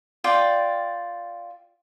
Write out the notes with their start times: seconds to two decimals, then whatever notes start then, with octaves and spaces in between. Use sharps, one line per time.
0.24 F4 D5 G5